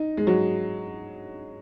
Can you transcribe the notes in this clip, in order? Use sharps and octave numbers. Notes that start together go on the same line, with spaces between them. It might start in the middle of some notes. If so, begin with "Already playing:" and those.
Already playing: D#4
G#3
F#3